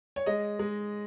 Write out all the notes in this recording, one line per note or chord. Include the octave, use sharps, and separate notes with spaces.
C#5
G#3 D#5
G#3